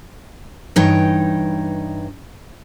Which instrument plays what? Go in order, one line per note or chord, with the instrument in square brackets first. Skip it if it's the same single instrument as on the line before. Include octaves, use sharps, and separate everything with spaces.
[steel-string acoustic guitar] G2 E3 D#4 C#5 D#5 G5